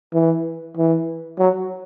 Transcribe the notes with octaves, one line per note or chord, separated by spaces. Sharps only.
E3
E3
F#3